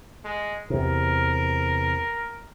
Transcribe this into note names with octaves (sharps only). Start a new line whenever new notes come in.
G#3
E2 C3 A#4